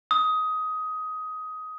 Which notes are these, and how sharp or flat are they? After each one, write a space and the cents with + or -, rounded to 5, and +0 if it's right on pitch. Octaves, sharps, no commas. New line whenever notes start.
D#6 +15